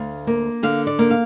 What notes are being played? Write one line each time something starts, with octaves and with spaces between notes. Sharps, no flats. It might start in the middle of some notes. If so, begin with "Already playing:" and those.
Already playing: D2 F5
A#3
D3 F5
D5
A#3
F5